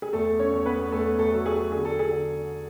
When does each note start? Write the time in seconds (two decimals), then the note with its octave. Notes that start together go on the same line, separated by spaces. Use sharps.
0.02 G#4
0.13 E2 A3 A4
0.39 C#4 C#5
0.54 E2
0.66 B3 B4
0.92 E2 A3 A4
1.19 A3 A4
1.32 F#3 A4
1.46 G#4
1.72 D3 G#4
1.85 A4
1.99 G#4
2.11 D3